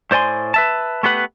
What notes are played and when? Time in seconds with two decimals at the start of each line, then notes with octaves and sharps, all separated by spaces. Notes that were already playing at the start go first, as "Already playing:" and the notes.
0.11 A2 C5 D5 G#5 C6
0.54 B4 E5 A5
1.03 A3 B3 G4 B4 F#5